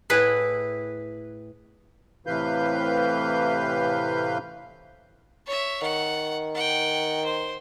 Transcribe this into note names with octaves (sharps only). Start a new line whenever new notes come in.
A2 E4 G#4 B4 G#5
A2 C3 E3 B4 F5 G6
C#5 E5
D#3 F#5
F#5 G5
C5